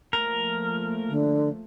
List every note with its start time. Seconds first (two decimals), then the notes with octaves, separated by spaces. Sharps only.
0.13 F3 A3 A#3 A#4
1.08 D3